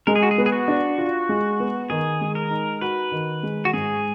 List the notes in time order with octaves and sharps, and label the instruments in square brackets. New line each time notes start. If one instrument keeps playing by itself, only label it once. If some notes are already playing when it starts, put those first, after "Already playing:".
[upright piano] G#3 [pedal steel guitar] A#4
[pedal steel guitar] G#4
F#4
G#4
[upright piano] B3
[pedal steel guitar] G#4
F#4
[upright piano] D4
F4
G#3
B3
[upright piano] D#3 [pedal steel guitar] G#4
[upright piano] G#3
[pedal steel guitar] A#4
[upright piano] D#4
[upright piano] F#4 [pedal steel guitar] B4
[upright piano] D#3
G#3
[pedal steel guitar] F#4
[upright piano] G#2 [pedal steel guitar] G#4